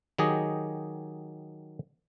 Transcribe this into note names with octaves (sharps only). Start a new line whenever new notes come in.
D#3 F#3 G4 G#4 D#5